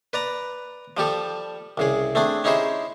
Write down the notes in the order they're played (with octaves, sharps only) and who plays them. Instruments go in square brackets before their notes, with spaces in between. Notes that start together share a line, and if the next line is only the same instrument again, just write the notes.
[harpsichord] B4 D5 A#5
F3 G3 G4 A4
C2 C#3 G#4
A3 C4 D4 G#4
C#4 D#4 E4 G4 G#4 C5